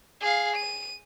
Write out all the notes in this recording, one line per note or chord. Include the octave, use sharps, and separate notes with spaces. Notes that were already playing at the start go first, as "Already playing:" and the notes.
G#4 F5
D#7